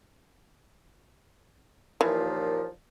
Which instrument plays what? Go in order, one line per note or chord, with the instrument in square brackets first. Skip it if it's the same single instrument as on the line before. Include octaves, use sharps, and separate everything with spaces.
[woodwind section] D#2 A#2 F3 [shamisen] E3